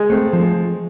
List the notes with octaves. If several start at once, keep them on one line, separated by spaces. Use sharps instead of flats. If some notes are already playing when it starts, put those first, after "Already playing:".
Already playing: G#3
A3 C4
F3